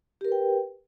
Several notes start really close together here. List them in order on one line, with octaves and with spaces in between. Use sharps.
G4 A#4 B4 G5